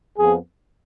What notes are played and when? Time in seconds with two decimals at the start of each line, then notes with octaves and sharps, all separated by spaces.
0.18 F2 F3 B3 G#4